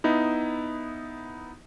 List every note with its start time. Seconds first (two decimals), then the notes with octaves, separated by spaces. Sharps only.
0.04 B3 D#4 E4